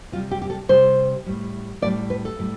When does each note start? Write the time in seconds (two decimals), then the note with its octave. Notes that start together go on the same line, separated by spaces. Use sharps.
0.12 C3 F4
0.16 G3
0.31 G4
0.42 G4
0.50 A4
0.69 C3 G3 C5
1.26 A2 G3
1.82 A2 D5
1.87 G3
2.10 B4
2.25 A4
2.39 A2 G3